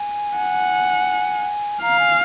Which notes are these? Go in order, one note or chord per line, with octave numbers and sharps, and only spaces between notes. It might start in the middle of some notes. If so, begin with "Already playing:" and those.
Already playing: G#5
F#5
F5 A#5
G#5